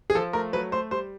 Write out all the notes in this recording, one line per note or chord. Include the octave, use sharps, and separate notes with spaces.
G#4
F3 A4
A3 A#4
F#3 B4
A3 C5
G3 C5